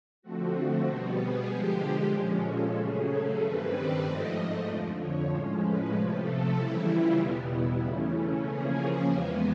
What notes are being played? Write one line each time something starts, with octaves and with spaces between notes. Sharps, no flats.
D3 F3 A3 C4 F#4
B2 G3 B3 F#4
G#4
D3 F3 G#3 G4
A#2 F3 G#3 C#4
A4
C#3 F#3 A3 C#4 G#4
A4
G2 D#3 G3 C4 B4
D5
G#2 F3 A3 D#5
F2 D3 F3 D5
C#5
A2 F3 G#3 C#4 C5
B4
C3 F3 A3
A4
C#3 E3 G3 E4
F4
E2 B2 G3 B3 F#4
E4
C#3 E3 A3 C#4 F4
C#3 F3 A#3 C#4 G#4
E2 C#3 E3 G#3 B3 G4